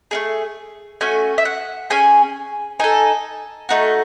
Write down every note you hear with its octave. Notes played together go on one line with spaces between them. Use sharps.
A3 C#4 G#4
A3 C#4 F#4 G#5
E5
F#5
C#4 G#4 G#5
D#4 A4 G#5
A3 D#4 F#4